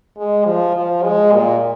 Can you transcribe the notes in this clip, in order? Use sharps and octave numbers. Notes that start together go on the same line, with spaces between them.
G#3
F3
F3
G#3
A#2